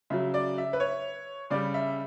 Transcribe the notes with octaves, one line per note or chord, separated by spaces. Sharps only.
C#3 F#3 E5
D5
E5
B4
C#5
C#3 G3 D5
E5